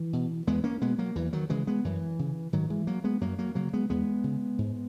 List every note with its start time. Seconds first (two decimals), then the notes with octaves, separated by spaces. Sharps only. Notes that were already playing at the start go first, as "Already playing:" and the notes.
Already playing: E3
0.13 B2
0.47 E2 G#3 B3
0.64 A#3 C#4
0.81 B2 G#3 B3
0.98 F#3 A#3
1.16 E2 E3
1.33 D#3 F#3
1.50 C#3 E3 G#3
1.67 G#3 B3
1.84 F#2 E3
2.19 C#3
2.53 G#2 D#3 F#3
2.70 E3 G#3
2.87 F#3 A#3
3.04 G#3 B3
3.21 F#2 F#3 A#3
3.39 F#3 A#3
3.55 C#3 F#3 A#3
3.73 G#3 B3
3.90 E2 G#3 B3
4.24 C#3
4.58 G#2